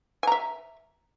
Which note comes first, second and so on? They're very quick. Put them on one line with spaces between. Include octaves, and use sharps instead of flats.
G#5 A#5 E5